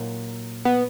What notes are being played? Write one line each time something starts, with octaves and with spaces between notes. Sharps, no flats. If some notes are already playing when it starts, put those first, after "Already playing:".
Already playing: A#2 F#3 A#3 D#4
B3